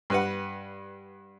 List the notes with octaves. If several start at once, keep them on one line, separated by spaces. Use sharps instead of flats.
G2 B4 F#5